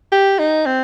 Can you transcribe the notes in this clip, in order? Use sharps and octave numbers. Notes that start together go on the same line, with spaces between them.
G4
D#4
C4